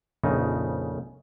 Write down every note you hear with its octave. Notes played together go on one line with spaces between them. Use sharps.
A#1 F2 C#3 D#4